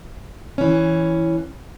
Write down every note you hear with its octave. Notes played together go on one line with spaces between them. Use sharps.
E3 C#4